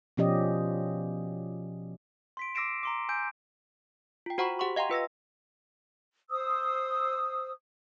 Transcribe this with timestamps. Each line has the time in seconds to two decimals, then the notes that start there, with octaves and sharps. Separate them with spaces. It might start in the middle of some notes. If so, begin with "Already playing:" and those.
0.17 B2 F3 C#4 G4 D5 D#5
2.37 C6 B6 D7
2.55 D6 E6 A#6 C7 D7 E7
2.83 A#5 C6 D6
3.09 G#5 E6 G6 D7
4.26 F4 G5
4.38 F#4 C5 F#5 A#5 B5 C#6
4.59 G4 F#5 C6 C#6
4.76 D#5 F5 G5 A#5 C6
4.89 F4 B4 E6 A#6
6.30 C5 D#6 E6